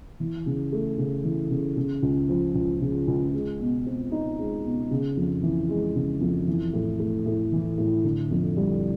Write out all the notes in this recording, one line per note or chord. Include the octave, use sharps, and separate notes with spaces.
E3
C#3
A3
C#3
E3
C#3
C#3
C#2
F3
C#2
C#3
C#2
G#3
B2
C4
D#4
G#3
B2
C#3
F2
E3
G#3
C#3
F2
E3
A2
A3
A2
E3
A2
D3
F2
G3